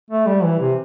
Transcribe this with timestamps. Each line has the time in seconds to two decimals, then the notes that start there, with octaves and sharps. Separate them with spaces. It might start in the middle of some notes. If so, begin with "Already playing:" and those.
0.11 A3
0.27 G3
0.44 E3
0.60 C3